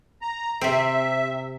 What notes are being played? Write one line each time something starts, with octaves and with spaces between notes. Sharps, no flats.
A#5
C3 C4 E5